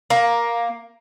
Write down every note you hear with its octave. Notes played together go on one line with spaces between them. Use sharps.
A#3